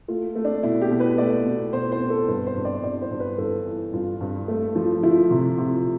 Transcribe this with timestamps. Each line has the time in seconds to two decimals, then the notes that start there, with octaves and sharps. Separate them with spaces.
0.08 A3 F4
0.35 A3
0.45 D4
0.63 B2 E4
0.82 G4
0.91 B2
1.00 B4
1.18 A3 D5
1.46 B2
1.73 B2 C5
1.92 C5
2.01 B2
2.10 A4
2.28 G2 B4
2.47 C5
2.56 G2
2.65 D5
2.83 G2 D5
3.02 C5
3.11 G2
3.20 B4
3.38 G2 A4
3.66 E3
3.93 G2 F4
4.21 G2
4.48 A3
4.75 F3
5.03 F3 E4
5.31 C3
5.58 C3